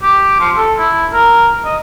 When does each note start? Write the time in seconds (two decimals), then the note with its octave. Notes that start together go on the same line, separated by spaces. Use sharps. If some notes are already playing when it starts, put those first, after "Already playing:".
0.02 G4
0.40 F3
0.56 A4
0.78 E4
1.13 A#4
1.65 D#5